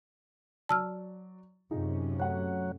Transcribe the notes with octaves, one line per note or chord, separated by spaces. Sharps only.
F#3 D5 A5 E6 F6
F#2 C3 C#4 D#4 F4 G#4
F#3 A3 F#5